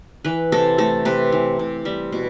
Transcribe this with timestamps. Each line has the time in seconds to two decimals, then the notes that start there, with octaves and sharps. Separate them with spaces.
0.25 E3 B4
0.52 C3 A4
0.78 A3 A4
1.05 C3 B4
1.32 E3
1.59 C3
1.85 G3 E5
2.12 B2